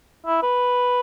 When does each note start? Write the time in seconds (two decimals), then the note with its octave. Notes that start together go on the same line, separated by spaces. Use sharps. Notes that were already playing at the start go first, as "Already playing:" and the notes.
0.26 E4
0.43 B4